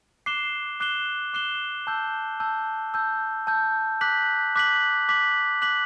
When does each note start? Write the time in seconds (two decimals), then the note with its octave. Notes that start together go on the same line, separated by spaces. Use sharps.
0.26 D6 F#6 C7 E7 G7
0.80 D6 F#6 C7 E7 G7
1.33 D6 F#6 C7 E7 G7
1.87 A5 E6 G6
2.40 A5 E6 G6
2.94 A5 E6 G6
3.47 A5 E6 G6
4.01 D6 F#6 B6 F#7
4.56 D6 F#6 B6 F#7
5.09 D6 F#6 B6 F#7
5.62 D6 F#6 B6 F#7